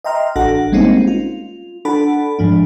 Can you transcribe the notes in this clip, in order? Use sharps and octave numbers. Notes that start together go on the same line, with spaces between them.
D#5 E5 G5 A#5 C6 F6
A1 D4 F#4 A4 F#5 A#6
G3 G#3 A#3 C4 C#4 D#4
F4
D4 A4 F#5 A5 B5
G#2 F3 D4